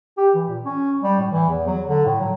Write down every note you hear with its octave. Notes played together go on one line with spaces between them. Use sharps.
G4
E3
A#2
C#4
G3
A2
E3
E2
F#3
D3
A2
F#3